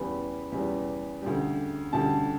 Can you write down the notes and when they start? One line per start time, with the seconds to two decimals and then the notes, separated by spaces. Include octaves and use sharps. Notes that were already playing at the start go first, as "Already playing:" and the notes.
Already playing: E2 C#3 G3 B3 B5
0.52 E2 C#3 G3 B3
1.22 D2 C#3 G3
1.92 D2 C#3 G3 A5